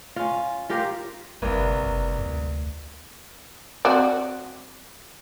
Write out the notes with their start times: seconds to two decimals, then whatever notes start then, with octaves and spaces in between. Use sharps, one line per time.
0.16 C#4 F4
0.69 F4 G4 A#4 F5
1.42 G1 C2 A#3 B4
1.84 F#1
2.18 D2
3.85 C4 F#4 D5